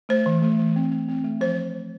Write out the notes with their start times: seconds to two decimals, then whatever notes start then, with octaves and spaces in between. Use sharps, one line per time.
0.09 A3 C5
0.26 E3
0.42 A3
0.59 E3
0.76 C4
0.92 C4
1.08 C4
1.24 A3
1.41 F3 C5